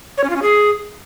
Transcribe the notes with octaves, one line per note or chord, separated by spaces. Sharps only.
C#5
C#4
F4
C#4
G#4